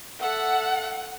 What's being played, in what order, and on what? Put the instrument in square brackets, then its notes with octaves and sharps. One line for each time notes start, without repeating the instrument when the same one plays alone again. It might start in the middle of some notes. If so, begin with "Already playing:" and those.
[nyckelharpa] A4 E5 [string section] F#5